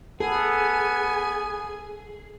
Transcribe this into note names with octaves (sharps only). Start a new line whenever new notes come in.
B3 G#4 A4 G#5